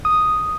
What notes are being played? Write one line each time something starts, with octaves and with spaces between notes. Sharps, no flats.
D#6